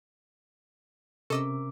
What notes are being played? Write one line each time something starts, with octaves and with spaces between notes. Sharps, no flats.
C3 C#4 A4 A#4 D#5 D6 E6